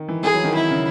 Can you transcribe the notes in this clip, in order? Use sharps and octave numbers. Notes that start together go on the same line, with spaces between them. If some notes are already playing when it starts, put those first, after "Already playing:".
Already playing: D#3
E3
E3 G#4
F#3
D#3
D#3 E4
C#3